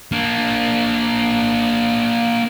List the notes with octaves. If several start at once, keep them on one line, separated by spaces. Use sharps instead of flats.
A#3 D4